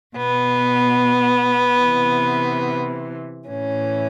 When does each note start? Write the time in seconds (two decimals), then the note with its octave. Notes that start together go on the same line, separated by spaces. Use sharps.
0.16 B2 B3
1.81 C3 E3
3.47 A2 E3 C#4